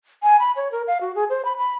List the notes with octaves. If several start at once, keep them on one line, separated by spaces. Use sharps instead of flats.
G#5
B5
C#5
A#4
F5
F#4
G#4
C5
B5
B5